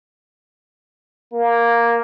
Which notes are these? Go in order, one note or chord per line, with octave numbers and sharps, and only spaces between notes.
A#3